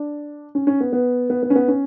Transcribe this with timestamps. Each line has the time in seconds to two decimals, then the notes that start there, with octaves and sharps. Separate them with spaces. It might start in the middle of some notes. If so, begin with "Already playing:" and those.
Already playing: D4
0.55 C#4
0.67 C#4
0.80 B3
0.93 B3
1.30 B3
1.43 B3
1.50 C#4
1.56 B3
1.68 C#4